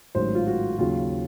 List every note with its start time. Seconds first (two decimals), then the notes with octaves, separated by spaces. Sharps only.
0.15 A1 G#2 D#3 F#3 C5
0.35 F4
0.47 F#4
0.79 D#2 C#3 F#3 F4